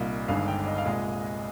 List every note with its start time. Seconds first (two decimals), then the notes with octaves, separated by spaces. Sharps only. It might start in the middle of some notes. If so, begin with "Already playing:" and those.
Already playing: C2 A#2 G3 A#3 D#4
0.28 G1 G2 D#3 G#3 F5
0.48 G5
0.66 D#5
0.78 F5
0.85 C2 A#2 G#3 D#5